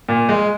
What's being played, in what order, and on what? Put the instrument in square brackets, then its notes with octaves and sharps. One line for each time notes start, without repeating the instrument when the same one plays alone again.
[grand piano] A#2
G#3